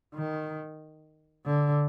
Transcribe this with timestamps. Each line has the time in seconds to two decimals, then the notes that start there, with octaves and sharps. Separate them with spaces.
0.15 D#3
1.46 D3